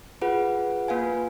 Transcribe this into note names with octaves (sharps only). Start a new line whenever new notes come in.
F4 G#4 B4 F#5
A#3 F4 B4 F5 G#5